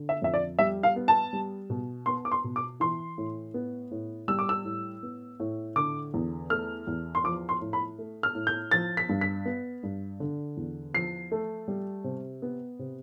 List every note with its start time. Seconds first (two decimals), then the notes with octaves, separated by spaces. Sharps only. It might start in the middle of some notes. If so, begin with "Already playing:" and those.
Already playing: D3
0.09 E5
0.22 F2 E5
0.34 D5
0.59 G3 E5
0.83 F5
0.96 B3
1.08 A5
1.33 G3
1.70 B2
2.06 B3 C6
2.25 D6
2.32 C6
2.44 B2
2.56 D6
2.80 E3 C6
3.18 A2
3.54 B3
3.91 A2
4.28 G3 E6
4.39 D6
4.49 E6
4.65 A2
5.03 B3
5.40 A2
5.76 D3 D6
6.14 E2
6.50 A3 F6
6.87 E2
7.15 C6
7.24 F3 D6
7.49 C6
7.61 A2
7.73 B5
7.99 A3
8.23 F6
8.35 A2
8.47 G6
8.71 F3 A6
8.97 B6
9.09 G2
9.21 B6
9.45 B3
9.83 G2
10.20 D3
10.57 E2
10.94 F3 C7
11.32 A3
11.68 G3
12.04 C3
12.42 B3
12.79 C3